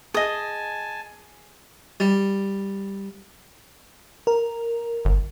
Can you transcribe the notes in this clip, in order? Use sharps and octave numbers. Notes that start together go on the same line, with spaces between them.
G#4 D#5 G#5 A5 D#6
G3
A#4
G1